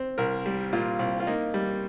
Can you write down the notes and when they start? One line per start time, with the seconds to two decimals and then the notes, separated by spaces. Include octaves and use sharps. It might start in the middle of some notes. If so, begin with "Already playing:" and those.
Already playing: C4
0.18 C2 A#4
0.46 G3
0.73 A#2 F4
0.99 C2
1.20 F4
1.27 A#3 D#4
1.54 G3